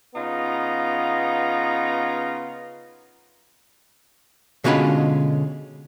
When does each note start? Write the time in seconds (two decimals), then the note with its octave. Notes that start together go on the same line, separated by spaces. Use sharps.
0.15 C#3 B3 D#4 F4 A#5
4.64 B2 D3 G#3 C#4 F4 B5